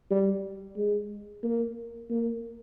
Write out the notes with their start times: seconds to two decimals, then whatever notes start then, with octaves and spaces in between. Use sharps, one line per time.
0.11 G3
0.76 G#3
1.43 A#3
2.10 A#3